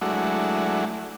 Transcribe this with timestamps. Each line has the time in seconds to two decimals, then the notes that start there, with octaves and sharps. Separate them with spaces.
0.01 F#3 G#3 A3 D4 E4 F#4